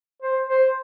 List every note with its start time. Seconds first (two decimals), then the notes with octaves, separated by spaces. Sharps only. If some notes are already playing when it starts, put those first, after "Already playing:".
0.23 C5
0.49 C5